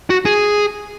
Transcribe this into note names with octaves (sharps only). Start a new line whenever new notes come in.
F#4
G#4